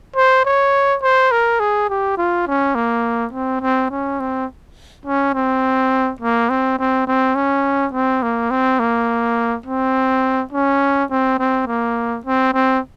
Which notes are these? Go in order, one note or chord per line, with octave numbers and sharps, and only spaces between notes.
C5
C#5
C5
A#4
G#4
G4
F4
C#4
A#3
C4
C4
C#4
C4
C#4
C4
A#3
C4
C4
C4
C#4
C4
A#3
C4
A#3
C4
C#4
C4
C4
A#3
C4
C4